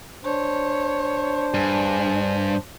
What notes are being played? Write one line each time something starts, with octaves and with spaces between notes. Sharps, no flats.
D4 C5 C#5
G2 G#4